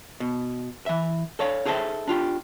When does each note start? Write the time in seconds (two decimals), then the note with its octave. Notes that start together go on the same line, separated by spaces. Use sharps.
0.20 B2
0.86 E3 E5
1.39 A4 C#5 F5
1.65 D#4 G#4 A4 C5 C#5 E5
2.08 D4 F4 G4